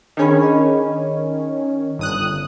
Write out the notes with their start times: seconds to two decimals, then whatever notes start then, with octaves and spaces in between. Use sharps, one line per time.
0.17 D#3 C#4 D4 G#4 B5
0.43 D#5
1.99 G1 D#6 F#6